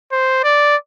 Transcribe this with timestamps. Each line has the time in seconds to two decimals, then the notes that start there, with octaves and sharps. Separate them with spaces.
0.12 C5
0.43 D5